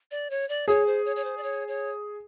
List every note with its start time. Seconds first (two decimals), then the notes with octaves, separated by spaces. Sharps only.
0.11 D5
0.30 C#5
0.49 D5
0.68 G#4 C#5
0.87 C5
1.05 C#5
1.16 C#5
1.24 C5
1.37 D5
1.43 C#5
1.68 C#5